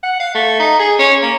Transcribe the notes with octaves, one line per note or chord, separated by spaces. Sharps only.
F#5
F5
A3
D#4
G#4
C#4
A#3